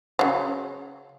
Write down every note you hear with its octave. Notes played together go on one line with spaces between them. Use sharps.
C#3 F#3